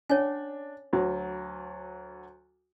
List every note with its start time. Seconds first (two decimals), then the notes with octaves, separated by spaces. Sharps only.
0.09 C#4 D4 C#5 G#5
0.93 D2 F#3